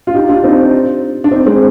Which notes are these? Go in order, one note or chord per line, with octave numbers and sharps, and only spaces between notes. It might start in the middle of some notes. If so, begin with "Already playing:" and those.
F4
D#4 G4
D4 F4
C4 D#4
D4
C4 D#4
G#3 C4